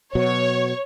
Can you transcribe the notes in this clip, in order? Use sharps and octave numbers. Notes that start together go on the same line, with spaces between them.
B2 F#3 C#5